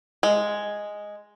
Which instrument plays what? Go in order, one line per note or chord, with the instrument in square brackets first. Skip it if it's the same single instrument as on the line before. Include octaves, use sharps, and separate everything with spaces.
[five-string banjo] G#3